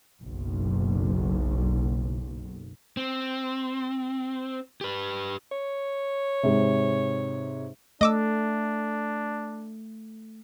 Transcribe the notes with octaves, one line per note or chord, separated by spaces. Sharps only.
F#1 B1
C4
G4 B4
C#5
G#2 C3
A3 D4 D#5 D6 E6